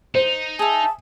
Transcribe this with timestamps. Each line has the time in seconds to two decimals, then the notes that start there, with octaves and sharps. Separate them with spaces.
0.15 D#4 C5
0.59 G#4 E5 A5